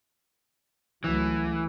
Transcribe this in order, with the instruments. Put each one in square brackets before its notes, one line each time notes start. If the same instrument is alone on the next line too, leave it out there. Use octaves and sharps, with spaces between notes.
[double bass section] C#2 F#3 A3 [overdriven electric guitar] E3